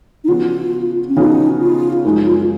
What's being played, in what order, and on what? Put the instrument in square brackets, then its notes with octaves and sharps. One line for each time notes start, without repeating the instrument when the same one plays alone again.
[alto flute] D#4
[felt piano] C#3 F3 B3 F#4 [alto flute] F4
[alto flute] C#4
[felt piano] C#3 F3 B3 F#4 [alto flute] D#4
[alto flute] F4
[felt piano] F#2 F3 G#3 C#4 [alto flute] D#4
[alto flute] F4